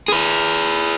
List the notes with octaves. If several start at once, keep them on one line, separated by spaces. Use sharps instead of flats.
G#4 B4